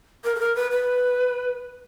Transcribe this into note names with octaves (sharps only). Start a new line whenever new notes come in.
A#4
A4
A#4
B4
B4